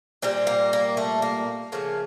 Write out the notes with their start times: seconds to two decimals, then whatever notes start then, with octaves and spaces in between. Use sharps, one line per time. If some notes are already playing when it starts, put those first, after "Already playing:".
0.22 A#2 G3 C4
0.47 A#3
0.73 A#3
0.97 A3
1.22 A#3
1.72 C#3 F3 A3 A#3